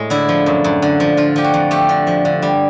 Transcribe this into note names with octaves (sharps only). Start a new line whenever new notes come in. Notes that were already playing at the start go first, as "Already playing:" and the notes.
Already playing: A2 G#3
D3 E4
F3
F#2
F#2
D3
F3
D3 F4
F3 G4
F#4
F2
A3 G4
D3
F3
D3
G3